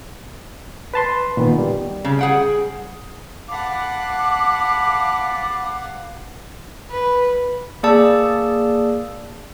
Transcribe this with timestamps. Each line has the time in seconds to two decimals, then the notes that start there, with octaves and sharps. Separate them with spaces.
0.94 B4 A5 C6
1.37 A#2 D#3 B3
1.59 G3
2.04 C#3
2.19 G#4 F#5 G5
3.49 F5 F#5 A5 B5 D6
6.91 B4
7.83 A#3 G#4 D5 A5 E6